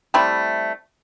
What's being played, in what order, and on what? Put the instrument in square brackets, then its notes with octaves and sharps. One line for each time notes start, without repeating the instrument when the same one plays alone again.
[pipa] G3 A3 C4 E4